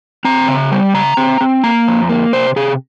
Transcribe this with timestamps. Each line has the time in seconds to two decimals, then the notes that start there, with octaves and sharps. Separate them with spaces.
0.25 C4 A#5
0.48 C#3
0.71 G3
0.94 C#3 A#5
1.17 C4
1.41 C4
1.64 A#3 A#5
1.87 F2
2.09 A#3
2.33 C3 C5
2.56 C3 G#4